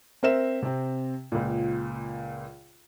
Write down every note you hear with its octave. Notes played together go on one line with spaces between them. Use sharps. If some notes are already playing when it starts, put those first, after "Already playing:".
C4 A#4 C5 E5 E7
C3 C4
C#2 A#2